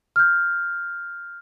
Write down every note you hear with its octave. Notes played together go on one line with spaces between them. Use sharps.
F6 G6